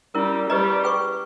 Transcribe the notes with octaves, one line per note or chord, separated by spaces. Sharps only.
G3 C#4 E4 A#4
G3 G4 B4 D#5 A#5
G#4 B4 G5 C#6